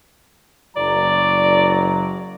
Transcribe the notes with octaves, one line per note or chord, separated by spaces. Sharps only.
F#1 F#3 D5 A#5